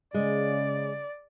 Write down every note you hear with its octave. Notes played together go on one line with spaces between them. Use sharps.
C#3 G#3 D5